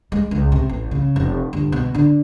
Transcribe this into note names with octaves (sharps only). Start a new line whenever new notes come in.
G#3
C#2
C3
A1
C#3
F1
G1
B2
D3